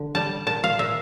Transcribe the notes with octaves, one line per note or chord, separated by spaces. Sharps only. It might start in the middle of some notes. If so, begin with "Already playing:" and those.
Already playing: D3
G3 A5
A#2 A5
F5
A#2 E5